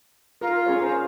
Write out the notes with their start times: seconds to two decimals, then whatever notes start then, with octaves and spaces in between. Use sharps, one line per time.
0.41 F4 A#4
0.66 C#4 G#4 C#5
0.80 A#4 C5